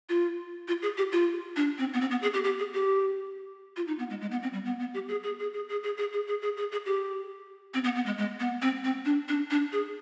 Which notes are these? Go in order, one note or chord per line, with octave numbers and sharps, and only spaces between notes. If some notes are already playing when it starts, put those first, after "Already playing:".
F4
F4
G#4
G4
F4
D4
C4
B3
C4
B3
G#4
G4
G4
G#4
G4
F4
D#4
B3
G#3
G#3
B3
C4
G3
B3
B3
G4
G#4
G#4
G#4
G#4
G#4
G#4
G#4
G#4
G#4
G#4
G#4
G#4
G4
C4
B3
B3
G#3
G#3
B3
C4
C4
D4
D4
D4
G#4